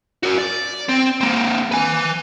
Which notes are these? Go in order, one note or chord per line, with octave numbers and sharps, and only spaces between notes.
F#4 A#4
D5
C4
A#3 C4
B4 G#5